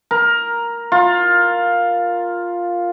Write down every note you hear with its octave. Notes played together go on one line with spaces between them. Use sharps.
A#4
F4